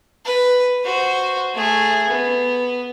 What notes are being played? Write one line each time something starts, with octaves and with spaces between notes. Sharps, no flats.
B4
F#4 C5
A3 G#4
B3